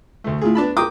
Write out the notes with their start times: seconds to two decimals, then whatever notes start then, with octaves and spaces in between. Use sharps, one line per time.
0.24 D2 A3
0.41 A2 F4 G#4
0.55 B3 D4 A5 B5
0.77 A#4 G5 D6 D#6